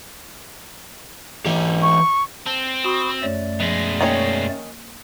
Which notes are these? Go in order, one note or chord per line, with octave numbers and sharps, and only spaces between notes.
E3 G4
C#6
C4 A5
F#4 B5 C#6 D#6
F#2 A3 C#5 D5
B2 F3 G#3
D#3 A#3 C#4 C#5